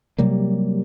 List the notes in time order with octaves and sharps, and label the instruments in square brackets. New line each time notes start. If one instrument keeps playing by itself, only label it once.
[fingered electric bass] C3 F#3 G3 A#3